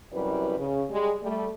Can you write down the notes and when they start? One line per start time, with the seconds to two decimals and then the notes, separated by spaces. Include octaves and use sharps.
0.12 F#2 C3 G3 E4 B4
0.58 C#3
0.90 G3 G#3
1.22 G3 A3